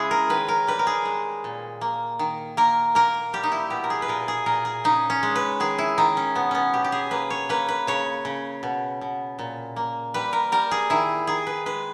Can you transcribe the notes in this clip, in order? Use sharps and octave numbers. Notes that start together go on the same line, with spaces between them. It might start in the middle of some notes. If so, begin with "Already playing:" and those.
Already playing: C#3 G#3 C#4 E4 G#4
A#4
D#3 B4
A#4
G3 B4
A#4
G#4
G#3
A#2
A#3
D#3
A#3 A#4
A#3 A#4
G3 G4
D#4
E4
B2 G4
A#4
G#4
B4
A#2 A#4
G#4
A#2 A#4
G#4
C#3 D#4
C#4
G#3
B4
D#3 G#4
E4
D#3 D#4
C#4
B2 B3
B3 C#4
B2 G4
G4
G#4
A#3 B4
C#5
A#3 B4
B4
C#3 C#5
C#3
B2
B2
A#2
A#3
G3 B4
A#4
G3 A#4
G#4
D#3 E4
D#3 G#4
B4
G#3 B4